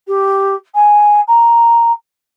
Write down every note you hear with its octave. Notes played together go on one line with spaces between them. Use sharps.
G4
G#5
A#5